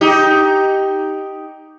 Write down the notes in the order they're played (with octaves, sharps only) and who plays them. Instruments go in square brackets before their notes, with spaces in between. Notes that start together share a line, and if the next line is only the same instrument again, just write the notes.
[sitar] D#4 G4